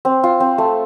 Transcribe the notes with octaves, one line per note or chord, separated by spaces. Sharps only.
C4
F4
C4
A3